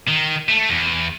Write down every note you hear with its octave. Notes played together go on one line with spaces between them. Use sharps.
D#3
A3
E2